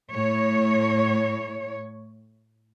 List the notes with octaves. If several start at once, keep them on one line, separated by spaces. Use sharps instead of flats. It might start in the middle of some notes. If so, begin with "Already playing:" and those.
A2 C#5